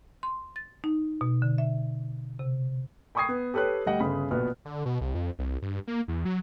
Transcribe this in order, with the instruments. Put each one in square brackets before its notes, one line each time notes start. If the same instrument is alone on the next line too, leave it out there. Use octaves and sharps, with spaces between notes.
[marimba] C6
A6
D#4
B2
D3
E5
C3
[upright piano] G5 B5 C#6 D#6 G#6 C7
B3
G4 A4 B4 C#5 F#6
D2 G3 D#5 F#5 G5
G1 C#3 B5
A#1 B2 B3 F6
[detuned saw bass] D3
B2
C2
F2
C2
G2
A#3
E2
F#3